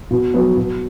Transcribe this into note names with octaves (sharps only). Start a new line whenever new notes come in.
B2
F#3 B3
B2